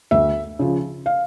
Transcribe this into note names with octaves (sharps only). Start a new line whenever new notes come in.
D2 E5
C#3 F3
F5